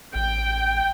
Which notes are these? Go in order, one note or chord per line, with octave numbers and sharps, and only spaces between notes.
A1 G5